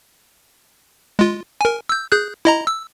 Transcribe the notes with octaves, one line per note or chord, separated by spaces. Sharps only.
G#3 F4
A#4 G#5
E6 G6
G#4 F#6 G6
E4 D#5 A#5
E6